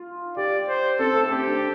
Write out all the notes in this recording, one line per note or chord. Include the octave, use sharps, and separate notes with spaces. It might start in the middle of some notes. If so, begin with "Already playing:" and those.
Already playing: F4
G4 D5
C5
C4 A4
A3
C4 G4
D4